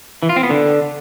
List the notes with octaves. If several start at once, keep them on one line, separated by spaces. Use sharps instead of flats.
E3
F4
C4
B3
D3